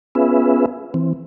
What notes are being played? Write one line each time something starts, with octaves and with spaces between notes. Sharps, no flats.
B3 C#4 F4 G#4 B4 E5
E3 C4